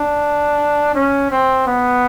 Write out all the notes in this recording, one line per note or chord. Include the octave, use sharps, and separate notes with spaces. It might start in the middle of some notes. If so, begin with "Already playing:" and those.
Already playing: D4
C#4
C4
B3